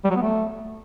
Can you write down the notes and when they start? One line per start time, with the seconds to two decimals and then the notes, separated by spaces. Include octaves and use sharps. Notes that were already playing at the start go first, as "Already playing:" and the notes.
0.04 G3
0.10 F#3
0.16 B3
0.22 A3